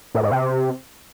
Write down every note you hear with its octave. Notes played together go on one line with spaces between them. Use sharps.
A2
G#2
C3